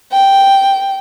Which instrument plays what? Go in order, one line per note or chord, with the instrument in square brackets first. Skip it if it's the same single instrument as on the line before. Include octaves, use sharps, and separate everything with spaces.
[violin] G5